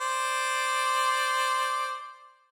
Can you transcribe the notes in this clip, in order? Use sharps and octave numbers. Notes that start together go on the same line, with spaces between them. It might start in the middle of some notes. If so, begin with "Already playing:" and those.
C5 D5